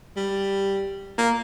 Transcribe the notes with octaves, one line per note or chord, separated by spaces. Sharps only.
G3
A#3